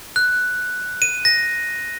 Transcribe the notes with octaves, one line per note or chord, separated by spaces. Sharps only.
F#6
D#7
A#6